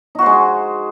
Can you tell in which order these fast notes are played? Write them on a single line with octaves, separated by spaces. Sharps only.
D#4 F#4 C5 G#3